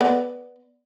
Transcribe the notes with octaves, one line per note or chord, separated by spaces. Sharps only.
B3 D5